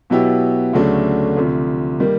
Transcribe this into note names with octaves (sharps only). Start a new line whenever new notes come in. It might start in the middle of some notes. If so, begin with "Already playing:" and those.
B2 F#3 B3 E4 G4
D2 C#3 F#3 A3 D4
D2 C3 F3
D#3 G3 A#3